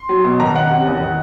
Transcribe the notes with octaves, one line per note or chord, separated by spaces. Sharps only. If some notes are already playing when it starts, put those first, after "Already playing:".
Already playing: C6
F#3
B2
D#3 A#5
C#4 F#5
C3
E2
D#3